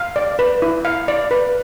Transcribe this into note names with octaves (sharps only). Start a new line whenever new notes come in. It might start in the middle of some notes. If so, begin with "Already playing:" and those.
Already playing: F5
D5
B4
E4
F5
D5
B4